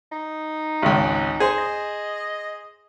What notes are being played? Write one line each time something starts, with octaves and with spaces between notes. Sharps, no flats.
D#4
G#1 C#2
G#4 C5
D#5